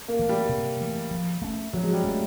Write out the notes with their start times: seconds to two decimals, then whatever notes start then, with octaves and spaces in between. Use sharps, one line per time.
0.08 A#3
0.19 E3 A3
0.29 G3
0.49 C3
0.81 E3 A3
1.11 F3
1.42 A3 C#4
1.73 F3 F#3
1.83 G#3
1.93 G3
2.04 A3 C#4